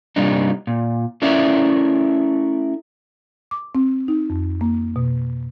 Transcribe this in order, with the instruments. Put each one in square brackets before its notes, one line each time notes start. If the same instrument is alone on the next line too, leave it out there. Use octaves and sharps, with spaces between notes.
[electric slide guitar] G2 C3 G3 A#3 D4 D#4
A#2
A3 C#4 E4 A#4 D5 E5
[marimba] D6
C4
D#4
F2
A#3
B2